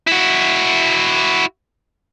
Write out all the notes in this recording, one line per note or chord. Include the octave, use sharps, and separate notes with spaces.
E4 F#4